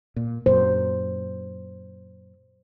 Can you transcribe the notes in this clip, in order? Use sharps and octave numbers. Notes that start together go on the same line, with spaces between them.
A#2
F#2 A#2 C5